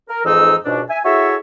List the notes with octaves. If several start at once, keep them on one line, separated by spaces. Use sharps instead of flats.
A#4
F2 G#2 E3 D#4 E6
C#2 G#2 B2 D4
E5 G#5
E4 F#4 G#4 A4 C#5 E5